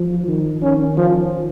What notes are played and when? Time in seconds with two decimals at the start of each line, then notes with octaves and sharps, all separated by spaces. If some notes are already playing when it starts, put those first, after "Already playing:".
Already playing: F3
0.28 D#3
0.63 D#3 C#4
0.97 F3